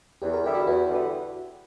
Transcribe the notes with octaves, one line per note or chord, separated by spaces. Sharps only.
E2 G4
A#4
D3 G3 B3 E4 G4
F#4
E2 F#4
D3 G3 B3 E4